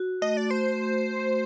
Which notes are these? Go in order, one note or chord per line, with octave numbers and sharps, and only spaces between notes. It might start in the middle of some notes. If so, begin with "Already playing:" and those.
Already playing: F#4
A3 D#5
D5
A3 C5